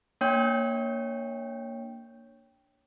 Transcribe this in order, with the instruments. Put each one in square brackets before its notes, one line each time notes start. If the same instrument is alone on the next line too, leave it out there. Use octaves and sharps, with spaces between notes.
[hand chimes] A#3 D4 C#5 G5 G6